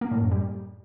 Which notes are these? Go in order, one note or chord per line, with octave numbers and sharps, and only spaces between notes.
A#3
A2
F#2
G3